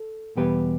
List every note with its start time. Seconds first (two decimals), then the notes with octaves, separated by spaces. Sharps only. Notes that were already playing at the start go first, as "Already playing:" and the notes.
Already playing: A4
0.36 E2 B2 G3 G4 B4